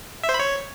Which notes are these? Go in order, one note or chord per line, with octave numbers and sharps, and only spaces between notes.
E5
C5
B5
C#5